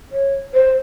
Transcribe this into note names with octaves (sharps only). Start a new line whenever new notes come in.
C#5
C5